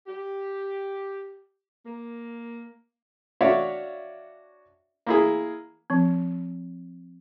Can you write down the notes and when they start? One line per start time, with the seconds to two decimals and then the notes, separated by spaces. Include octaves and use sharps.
0.07 G4
1.85 A#3
3.41 D4 F#4 C#5 D5 E5 F5
5.06 A#3 E4 G#4
5.90 F3 C4